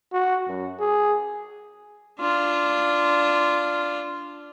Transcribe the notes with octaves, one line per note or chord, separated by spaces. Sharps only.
F#4
F#2
G#4
D4 F4